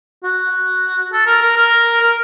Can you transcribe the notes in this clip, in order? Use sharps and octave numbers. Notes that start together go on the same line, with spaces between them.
F#4
A4
A#4
A#4
A#4
A#4